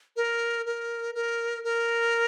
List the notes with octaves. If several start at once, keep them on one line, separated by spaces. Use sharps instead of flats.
A#4
A#4
A#4
A#4